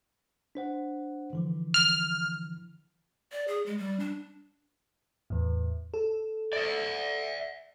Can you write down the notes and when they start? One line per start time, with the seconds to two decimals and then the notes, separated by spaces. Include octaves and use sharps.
0.55 D4 C5 F#5
1.33 D3 E3 F3
1.74 F6
3.32 D5
3.48 G#4
3.66 G#3
3.78 G3
4.00 D4
5.30 E2 A2
5.94 A4
6.53 D5 E5